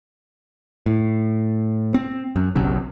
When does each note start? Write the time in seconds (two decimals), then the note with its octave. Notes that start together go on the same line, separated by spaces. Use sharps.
0.86 A2
1.94 C4
2.36 F#2
2.55 F#1 B1 F#2 C3